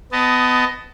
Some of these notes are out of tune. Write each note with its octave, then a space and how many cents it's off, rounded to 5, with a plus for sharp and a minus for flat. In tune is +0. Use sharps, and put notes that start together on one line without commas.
B3 +25 D#5 +0 A5 +0